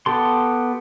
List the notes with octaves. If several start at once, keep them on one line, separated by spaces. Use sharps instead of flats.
B3 G4 A4 C6